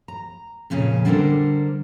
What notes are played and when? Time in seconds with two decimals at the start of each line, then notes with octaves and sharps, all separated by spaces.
0.08 A#5
0.70 F2 A#2 C#3 C#4
1.05 D3 G3 D4 A4 A#4 C5